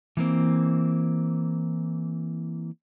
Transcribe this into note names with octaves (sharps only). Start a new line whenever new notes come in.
E3 A#3 C4